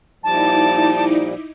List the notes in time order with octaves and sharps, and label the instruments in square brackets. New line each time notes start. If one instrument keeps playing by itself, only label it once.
[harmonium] A#2 F3 G3 [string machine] D#4 E4 D6 [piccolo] A5